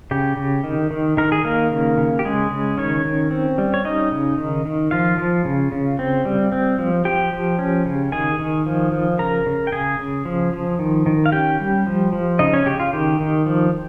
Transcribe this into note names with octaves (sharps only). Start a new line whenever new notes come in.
C#3 G4
C#3
D#3
D#3
D#3 A#4
G#4
D#3 A#3 A#4
C#3
C#3
G4
C#3 G#3 G#4
C#3
D#3 C#4 C#5
D#3
C4
G3
C#5
C#4 D#4 D#5
C#3
D#3
D#3
F3 F4 F5
F3
C#3
C#3
C4
G3
C4
F3
F3 G4 G5
F3
C#4
C#3
D#3 G#4 G#5
D#3
F3
F3
C#3 A#4 A#5
C#3
G5
C#3 G#4 G#5
C#3
F3
F3
D#3
D#3
F5
C#4 G4 G5
G3
F3
F3
C#3 D#4 D#5
C#4 C#5
C#3 G4
F4
D#3 G4
D#3
F3